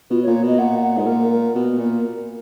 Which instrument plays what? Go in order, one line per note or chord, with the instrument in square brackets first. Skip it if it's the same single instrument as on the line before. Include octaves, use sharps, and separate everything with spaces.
[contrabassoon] B2 [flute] F4
[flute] C#5
[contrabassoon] A#2
[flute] C#5
[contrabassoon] B2 [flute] D#5
[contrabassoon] A#2 [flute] F#5
[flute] F#5
[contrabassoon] G#2 [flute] G#4
[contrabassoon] A#2 [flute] A#4
[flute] A#4
[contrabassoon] B2
A#2